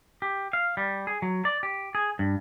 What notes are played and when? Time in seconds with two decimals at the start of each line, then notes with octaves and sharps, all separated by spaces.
0.22 G4
0.53 F5
0.77 G3
1.07 G#4
1.22 F#3
1.45 D5
1.63 G4
1.95 G#4
2.19 G2